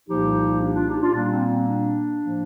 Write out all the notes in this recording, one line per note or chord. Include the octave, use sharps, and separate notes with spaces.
C2 A#2 F3 A#3 D#4 G4
D4
D4 F4
D#4 G4
D4 F4
A#2 G3 A#3 D4
C4
C4
D4
A2 F3 A#3